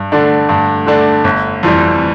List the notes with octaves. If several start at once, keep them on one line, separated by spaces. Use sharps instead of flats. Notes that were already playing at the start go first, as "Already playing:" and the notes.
Already playing: G2
D3 A3 D4
G2
D3 A3 D4
G1
F2 E3 G3